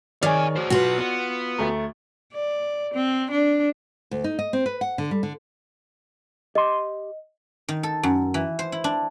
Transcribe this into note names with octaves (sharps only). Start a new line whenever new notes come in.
D#3 G#4 C#5 D5 F5 G#5
F#4 C5
B1 F4 F#4 B4
B3
D2 A3 A#5
D5
C4
D4
D2
D#4
D#5
C4
B4
F#5
D3
G3
D3
G4 D#5 C6
D#3
A4
F#2
E3
C5
E4
D4